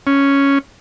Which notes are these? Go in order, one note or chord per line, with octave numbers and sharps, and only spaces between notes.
C#4